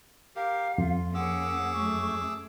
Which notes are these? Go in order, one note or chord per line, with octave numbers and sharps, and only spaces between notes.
G4 A#4 F5
F2 F4
F3 A#3 C#4 G#4 F#5 D6 E6
F#2 A3 C#6